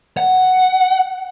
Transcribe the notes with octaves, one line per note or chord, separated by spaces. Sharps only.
F#5